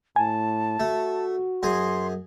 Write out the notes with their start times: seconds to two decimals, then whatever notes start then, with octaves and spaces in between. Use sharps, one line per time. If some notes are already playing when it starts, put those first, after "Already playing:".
0.16 A2 G#5 A5
0.80 A3 F#4
1.63 F#2 G#4 C6